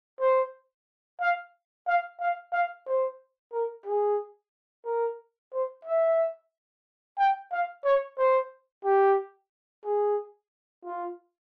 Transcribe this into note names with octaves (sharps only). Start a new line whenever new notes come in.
C5
F5
F5
F5
F5
C5
A#4
G#4
A#4
C5
E5
G5
F5
C#5
C5
G4
G#4
F4